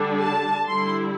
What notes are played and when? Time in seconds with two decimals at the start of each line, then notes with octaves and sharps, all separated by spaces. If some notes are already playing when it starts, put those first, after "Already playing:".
Already playing: D3 G3 D4
0.20 A5
0.66 D3 G3 E4 C6